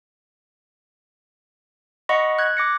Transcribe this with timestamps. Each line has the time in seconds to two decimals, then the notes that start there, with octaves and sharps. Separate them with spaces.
2.09 D#5 F#5 B5 C#6 A#6
2.39 F#6 G#6
2.57 D6 A#6 C#7